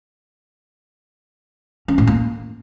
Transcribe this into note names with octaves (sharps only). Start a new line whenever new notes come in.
C#4
A2
A#3